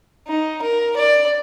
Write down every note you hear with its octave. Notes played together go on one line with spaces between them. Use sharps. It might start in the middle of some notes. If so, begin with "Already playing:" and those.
D#4
A#4
D5